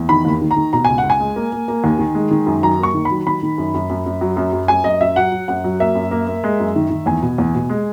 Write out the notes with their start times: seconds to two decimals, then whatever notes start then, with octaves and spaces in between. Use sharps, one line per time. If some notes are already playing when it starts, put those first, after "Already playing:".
Already playing: E2
0.09 D#3 B5
0.25 D#2
0.41 D#3
0.51 A#5
0.56 D#3
0.73 B2 A#5
0.85 C#2 G#5
0.98 F#5
1.04 C#2
1.10 G#5
1.20 G#3
1.36 A#3
1.52 A#3
1.68 A#3
1.84 D#2
1.99 D#3
2.14 G#3
2.31 D#3
2.46 F#2
2.62 F#3 A#5
2.79 A#3 C#6
2.94 D#3
3.05 B5
3.11 F#3
3.26 D#3 B5
3.43 D#3
3.58 F#2
3.74 F#2
3.90 F#2
4.06 F#2
4.21 F#3
4.37 F#2
4.53 F#2
4.68 F#2 G#5
4.84 F#2 D#5
5.01 F#2 E5
5.16 F#3 F#5
5.32 F#3
5.48 F#2 F#5
5.64 F#3
5.80 A#3 E5
5.95 F#2
6.11 A#3
6.27 A#3
6.44 G#3
6.60 F#2
6.76 D#3
6.90 D#3
7.06 E2 G#5
7.22 B2
7.38 E2
7.55 B2
7.69 G#3